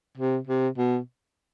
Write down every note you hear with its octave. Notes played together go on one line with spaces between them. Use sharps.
C3
C3
B2